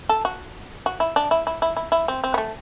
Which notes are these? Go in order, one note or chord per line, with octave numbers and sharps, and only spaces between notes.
A4
F#4
F#4
E4
D4
E4
E4
E4
E4
E4
C4
C4
B3
A3